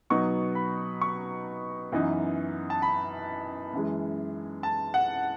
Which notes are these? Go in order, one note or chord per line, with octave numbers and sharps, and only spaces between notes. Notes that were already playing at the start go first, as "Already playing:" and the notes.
B2 F#3 B3 D#4 C#6
B5
C#6
F#2 E3 B3 D#4
A5
B5
F#2 E3 G#3
A5
F#5